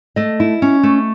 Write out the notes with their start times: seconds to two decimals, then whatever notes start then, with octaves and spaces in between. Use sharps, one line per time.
0.16 A3 D#5
0.40 E4
0.62 C#4
0.83 A3